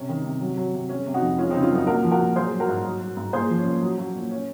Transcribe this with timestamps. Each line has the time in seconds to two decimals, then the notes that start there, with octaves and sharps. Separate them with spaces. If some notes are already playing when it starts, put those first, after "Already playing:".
Already playing: C3 C#4
0.09 D#3
0.25 C3
0.41 F#3
0.57 F#3
0.73 C3
0.89 G#3 C#4
1.06 C3
1.14 D#4 F#4
1.22 F2
1.38 G#3 C#4 F4
1.50 C#3 C4 D#4
1.62 C#4 F4
1.71 F#2 D#4 F#4
1.87 A#2 F#4 A#4
2.03 F3
2.12 F#4 A#4
2.20 A#2
2.36 F#3 G#4 C5
2.52 F#3
2.60 F#4 A#4
2.68 G#2
2.85 F#3
3.01 F#3
3.17 G#2
3.33 A#2 G#4 C5
3.49 F3
3.58 C#4
3.66 A#2
3.82 F#3
3.98 F#3
4.15 A#2
4.31 C#4